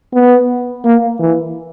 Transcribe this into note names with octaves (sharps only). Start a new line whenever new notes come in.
B3
A#3
E3